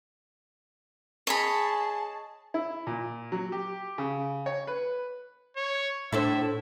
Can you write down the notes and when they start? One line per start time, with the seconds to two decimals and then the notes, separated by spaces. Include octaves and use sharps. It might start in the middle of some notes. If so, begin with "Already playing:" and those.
1.27 G#4 C#5 D#5 A5 B5
2.54 E4
2.87 A#2
3.32 F#3
3.52 G4
3.98 C#3
4.46 C#5
4.67 B4
5.56 C#5
6.13 A2 D4 E4 A4 C5 E5